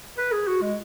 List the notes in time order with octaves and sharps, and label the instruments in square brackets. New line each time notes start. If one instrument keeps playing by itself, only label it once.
[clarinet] B4
G#4
F#4
G#3